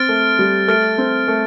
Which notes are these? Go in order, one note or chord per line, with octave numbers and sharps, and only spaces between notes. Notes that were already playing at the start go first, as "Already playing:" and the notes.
Already playing: C4 F6 A6 D7
A3
G3
A3 F6 A6 D7
C4
A3